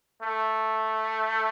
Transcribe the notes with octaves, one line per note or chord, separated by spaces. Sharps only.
A3